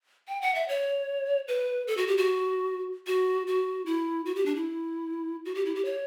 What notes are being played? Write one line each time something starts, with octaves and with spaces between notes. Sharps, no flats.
G5
F#5
E5
C#5
B4
A4
F#4
G4
F#4
F#4
F#4
E4
F#4
G4
D4
E4
F#4
G4
E4
G4
C#5